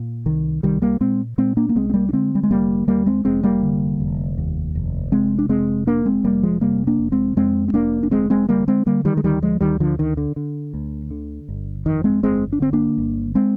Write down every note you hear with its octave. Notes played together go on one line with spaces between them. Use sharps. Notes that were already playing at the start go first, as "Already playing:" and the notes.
Already playing: A#2
C2 D#3
C2 D#3 G3
G3 A#3
A#2 G#3 C4
A#2 G#3 C4
A#3 D4
A#3
C2 G#3 C4
C4
G3 A#3
D4
D3 G#3 C4
G3
G#3
F1 G3 A#3
D#2 G3 A#3
G#3 C4
F1 G#3 C4
G3 A#3
D3
F1
D#2
F1
C3 G#3 C4
D4
F1 G#3 C4
F2 A#3 D4
G#3 C4
F1 G3 A#3
F3 G#3
C3 G3 A#3
A#3 D4
F1
G#3 C4
F2 G#3 C4
C4
F1 A#3 D4
D4
D2 G#3 C4
G#3 C4
D3 G3 A#3
G#3 C4
D3 G3 A#3
D#3 G3
G#3
D2 D#3 G3
F3 G#3
D2 D#3 G3
D3 F3
D3 D#3
D3
D3
D2
D3
G1
F2 D#3
G#3 C4
G1 G#3 C4
D4
D3 C4
A#3 D4
G1
G#3 C4